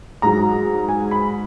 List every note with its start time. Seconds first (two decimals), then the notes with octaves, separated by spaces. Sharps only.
0.22 G#2 F#3 A#5
0.89 G#5
1.11 B5